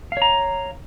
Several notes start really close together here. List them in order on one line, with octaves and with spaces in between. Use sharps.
F5 C#5 A#5